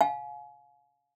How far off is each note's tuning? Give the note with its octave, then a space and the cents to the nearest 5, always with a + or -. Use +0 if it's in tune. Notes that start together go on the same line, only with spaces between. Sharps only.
F5 +25 G#5 +30